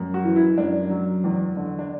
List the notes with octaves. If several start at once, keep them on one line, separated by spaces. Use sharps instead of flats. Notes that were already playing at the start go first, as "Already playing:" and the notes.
Already playing: F#2
F#4
E3
E4
F#2 D4
F#3
E2
D3
D4